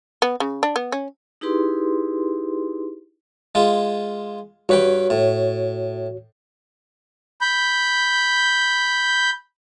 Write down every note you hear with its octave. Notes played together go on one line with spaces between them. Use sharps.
B3
C#3
D4
B3
C#4
D#4 E4 G4 G#4 B4 C6
G#3 F4
G2 F#4 B4 C#5 G5
A2
B5 G6